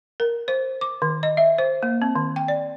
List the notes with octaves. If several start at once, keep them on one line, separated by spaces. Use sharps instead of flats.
A#4
C5
D6
D#3
D#5
E5
C5
A#3
C4
D#3
G5
D5